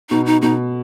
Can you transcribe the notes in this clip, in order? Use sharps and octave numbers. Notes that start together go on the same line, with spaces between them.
B2 D#4
D#4
B2 D#4